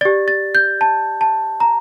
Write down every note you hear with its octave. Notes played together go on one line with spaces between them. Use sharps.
G4 D5 A6
A6
G6
A5
A5
A#5